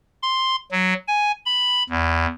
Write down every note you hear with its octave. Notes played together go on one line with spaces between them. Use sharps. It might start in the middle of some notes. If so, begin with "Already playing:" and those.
C6
F#3
G#5
B5
E2